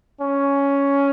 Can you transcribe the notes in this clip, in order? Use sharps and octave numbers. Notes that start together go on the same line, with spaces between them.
C#4